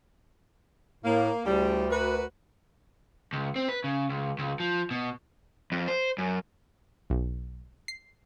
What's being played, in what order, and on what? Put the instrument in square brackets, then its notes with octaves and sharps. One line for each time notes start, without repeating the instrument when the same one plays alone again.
[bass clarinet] A2 [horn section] A#3
[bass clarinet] D2 [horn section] A2 C#3 G3
[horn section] F#4 A#4 B4
[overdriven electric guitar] C#2
C4
B4
C#3
C#2
C#2
F3
B2
F2
C5
F#2
[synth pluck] B1
C7